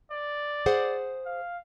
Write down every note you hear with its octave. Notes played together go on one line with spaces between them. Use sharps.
D5
G#4 C5 F#5
F5